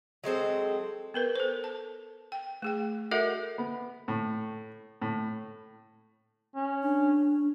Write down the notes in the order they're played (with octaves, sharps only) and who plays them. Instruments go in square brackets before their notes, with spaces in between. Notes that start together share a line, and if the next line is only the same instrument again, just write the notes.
[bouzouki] F#3 G#3 C4 A4
[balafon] B3 A#4 B4
A4 C5
A5
G5
A3 G#4 G5
F#4 A4 A#4 D#5 E5 F#5
[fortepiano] B3
A2
A2
[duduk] C#4
[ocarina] D4